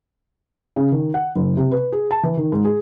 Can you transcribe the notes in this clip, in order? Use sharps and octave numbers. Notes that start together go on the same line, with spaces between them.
C#3
D#3
F#5
F#1
C3
B4
G#4
A5
E3
D#3
G#2
G#4